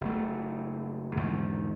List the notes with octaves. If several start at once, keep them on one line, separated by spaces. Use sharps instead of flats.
F#1 A3
E2 G#2 D3 D#3